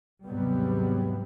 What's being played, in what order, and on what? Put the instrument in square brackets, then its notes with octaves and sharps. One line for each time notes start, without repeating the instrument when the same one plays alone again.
[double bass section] D#2 G#2 C3 F#3 G3 B3